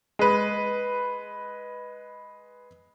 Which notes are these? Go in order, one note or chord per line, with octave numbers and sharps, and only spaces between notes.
G#3 B4